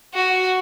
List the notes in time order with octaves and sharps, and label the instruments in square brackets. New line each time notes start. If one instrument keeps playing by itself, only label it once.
[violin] F#4